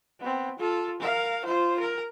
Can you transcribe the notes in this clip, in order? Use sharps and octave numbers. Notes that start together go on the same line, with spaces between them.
B3 C4
F4 A4
A#4 F5
F4 C5
A#4